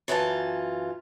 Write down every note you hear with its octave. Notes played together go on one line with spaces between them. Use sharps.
F#2 E3 F4 A5